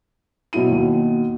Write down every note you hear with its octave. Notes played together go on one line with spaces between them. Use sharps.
B2 F#3 E4 D#7
D#2 B2